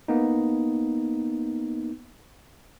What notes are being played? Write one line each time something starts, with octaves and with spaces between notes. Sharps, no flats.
A#3 B3 D#4